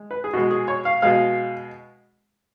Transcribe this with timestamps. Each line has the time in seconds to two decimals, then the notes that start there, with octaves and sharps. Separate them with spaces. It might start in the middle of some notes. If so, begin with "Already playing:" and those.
Already playing: G#3
0.11 B4
0.24 G#4
0.33 B2 G#3 F#4
0.51 G#4
0.68 C#5
0.85 F5
1.02 B2 G#3 F5